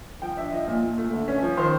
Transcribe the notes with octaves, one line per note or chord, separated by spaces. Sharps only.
F3 G5
D4 E5
F3 D#5
A#2
A#2
A3
D3
C#4
F3
D#3 C5